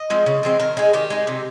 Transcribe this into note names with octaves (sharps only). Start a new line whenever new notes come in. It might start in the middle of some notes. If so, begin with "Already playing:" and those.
Already playing: D#5
F3 G#3 C4
C#3
F3 G#3 C4
D#3 A#4
G#3 D#4 G#4
D#3 G4
G#3 D#4
C3